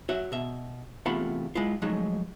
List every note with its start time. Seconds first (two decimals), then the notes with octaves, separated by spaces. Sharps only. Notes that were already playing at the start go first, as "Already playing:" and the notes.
0.09 F#4 C#5 E5
0.32 B2 E5
1.06 E2 C3 A3 F4 F#5 B5
1.55 G#3 E4 F4
1.82 F3 F#3 G#3 A3 D#4